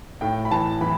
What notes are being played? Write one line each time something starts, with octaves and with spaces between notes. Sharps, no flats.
A2 G5
B5
E3 A5
E3 B5